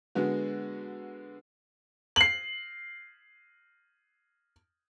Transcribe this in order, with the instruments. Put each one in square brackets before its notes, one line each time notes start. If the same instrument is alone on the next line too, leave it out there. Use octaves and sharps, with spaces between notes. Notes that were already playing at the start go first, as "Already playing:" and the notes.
[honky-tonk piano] D3 G#3 B3 F#4
[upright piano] C7 F#7